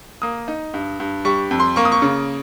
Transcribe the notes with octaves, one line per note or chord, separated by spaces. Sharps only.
A#3 D#6
D#4
G2
G2
G3 C#6
F2
C6
A#3 C#6
D#6
C#6
C#3